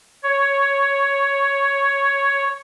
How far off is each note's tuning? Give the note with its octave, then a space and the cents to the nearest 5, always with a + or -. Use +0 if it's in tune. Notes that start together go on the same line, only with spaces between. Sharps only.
C#5 +5